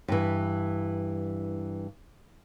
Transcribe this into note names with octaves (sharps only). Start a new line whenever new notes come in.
G2 E3